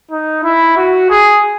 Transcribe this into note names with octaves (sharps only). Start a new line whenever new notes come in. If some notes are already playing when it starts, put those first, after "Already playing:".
D#4
E4
F#4
G#4